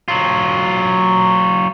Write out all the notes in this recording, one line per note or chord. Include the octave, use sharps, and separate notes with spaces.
F#3 F4